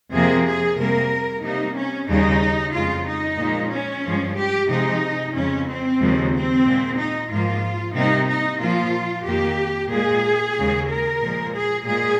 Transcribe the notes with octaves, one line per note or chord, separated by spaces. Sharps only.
F2 C3 F3 A#3 G#4
G#4
C3 G3 A#3 A#4
C3 G3 A#3 D#4
C#4
D#2 C#3 G3 D#4
F2 C#3 G#3 F4
D#4
A#2 F3 G#3
C#4
G2 F3 G#3
G4
C3 F3 G#3 D#4
F2 C#3 G#3 C#4
C4
D#2 C#3 F3 G#3
C4
A#2 G#3
D#4
G#2 F3 A#3 F4
C3 G3 A#3 D#4
D#4
A#2 F3 A#3 F4
F2 D#3 A#3 G4
A#2 G#3 G#4
D#2 C#3 G#3
A#4
A#2 F3 G#3
G#4
A#2 G#3 G#4